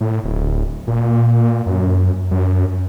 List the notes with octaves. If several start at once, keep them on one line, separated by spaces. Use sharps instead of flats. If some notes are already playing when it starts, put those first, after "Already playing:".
A2
D1
A#2
F#2
F#2